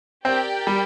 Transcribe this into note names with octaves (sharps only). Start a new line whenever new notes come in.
C4 G4 A#4 D5 G5
G3